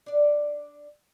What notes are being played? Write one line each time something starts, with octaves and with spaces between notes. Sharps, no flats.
D4 D5